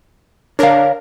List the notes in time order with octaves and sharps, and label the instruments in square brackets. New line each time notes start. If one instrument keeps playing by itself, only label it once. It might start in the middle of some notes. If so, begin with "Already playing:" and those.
[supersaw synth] D4 A#4 [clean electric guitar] C#5 F5